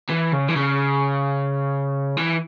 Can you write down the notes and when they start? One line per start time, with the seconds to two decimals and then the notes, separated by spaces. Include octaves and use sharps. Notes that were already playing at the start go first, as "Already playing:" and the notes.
0.10 E3
0.33 C#3
0.49 E3
0.56 C#3
2.17 E3